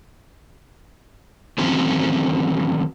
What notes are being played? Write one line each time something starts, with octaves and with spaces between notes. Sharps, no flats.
D#3 E3 F#3 A3 C4 C#4